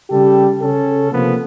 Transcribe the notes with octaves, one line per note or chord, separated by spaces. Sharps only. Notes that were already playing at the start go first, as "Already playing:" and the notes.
C#3 G3 G4 A4
C#3 C#4 A4
C3 F3 A#3 B3